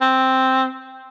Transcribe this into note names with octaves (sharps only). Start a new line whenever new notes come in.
C4